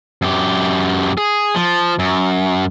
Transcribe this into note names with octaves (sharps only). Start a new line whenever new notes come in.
F#2 G4
G#4
F3
F#2